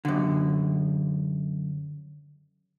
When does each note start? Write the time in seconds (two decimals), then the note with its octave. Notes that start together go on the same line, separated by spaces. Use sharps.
0.05 F#2 D3